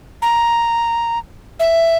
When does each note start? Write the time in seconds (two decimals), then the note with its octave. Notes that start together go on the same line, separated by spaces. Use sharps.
0.22 A#5
1.60 E5